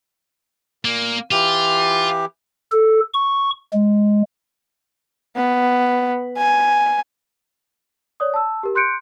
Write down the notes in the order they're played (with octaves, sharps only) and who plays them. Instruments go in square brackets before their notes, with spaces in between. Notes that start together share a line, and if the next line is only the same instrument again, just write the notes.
[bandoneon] A#2 [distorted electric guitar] A#3
[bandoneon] E3 G4 [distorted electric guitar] F4
[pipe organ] A4
C#6
G#3
[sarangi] B3
G#5
[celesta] C#5 D5 D#6
A5 E6
G4 A#4
C6 F#6 G6 C#7 D7